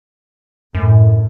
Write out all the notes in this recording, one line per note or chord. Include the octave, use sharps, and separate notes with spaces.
F#2 A2